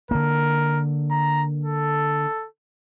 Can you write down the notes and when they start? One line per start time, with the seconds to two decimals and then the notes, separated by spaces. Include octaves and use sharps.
0.11 D3 A#3 A#4
1.11 A#5
1.65 A4